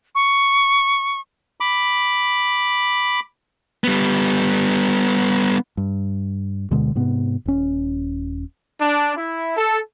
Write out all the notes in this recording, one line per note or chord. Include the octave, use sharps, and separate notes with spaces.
C#6
B5 D6
G3 B3
G2
D2 B2 D3 G#3
G#2 C3 B3
D#1 C#4
D4
E4
A4